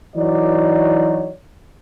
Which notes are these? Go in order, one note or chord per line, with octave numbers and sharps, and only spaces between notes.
E3 F#3 D#4 F#4 C#5 D5